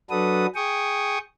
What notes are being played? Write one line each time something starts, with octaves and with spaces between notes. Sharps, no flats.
F#3 D4 F#4 A4 B4 D#6
G#4 G5 C#6 D#6